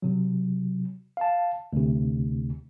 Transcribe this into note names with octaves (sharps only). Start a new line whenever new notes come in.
C3 F#3
F5 A5
D2 C3